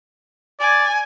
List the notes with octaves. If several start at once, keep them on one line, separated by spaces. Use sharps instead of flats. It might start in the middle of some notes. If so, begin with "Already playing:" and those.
D5 G#5